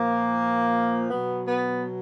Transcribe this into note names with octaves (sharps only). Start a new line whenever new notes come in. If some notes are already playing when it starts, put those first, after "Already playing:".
Already playing: A#2 F3 A#3
B2 F#3 B3
B3